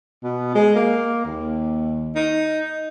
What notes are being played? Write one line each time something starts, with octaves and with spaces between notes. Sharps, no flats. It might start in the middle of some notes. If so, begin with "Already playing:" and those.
B2
G#3
A#3
D#2
D#4